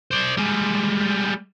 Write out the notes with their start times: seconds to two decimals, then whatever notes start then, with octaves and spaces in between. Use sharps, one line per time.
0.11 C5 D5
0.37 G3 G#3